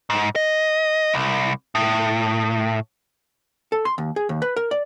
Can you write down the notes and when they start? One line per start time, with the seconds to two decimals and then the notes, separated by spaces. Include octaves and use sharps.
0.10 G#2
0.36 D#5
1.14 C2
1.75 A2
3.72 A4
3.85 C6
3.98 D#2
4.16 G#4
4.29 D#2
4.42 B4
4.56 A#4
4.71 D5